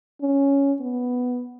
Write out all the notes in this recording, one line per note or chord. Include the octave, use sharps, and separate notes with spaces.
C#4
B3